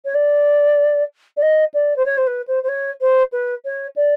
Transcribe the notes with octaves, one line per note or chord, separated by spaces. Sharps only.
C#5
D5
D5
D#5
D5
C5
C#5
C5
B4
C5
C5
C#5
C5
B4
C#5
D5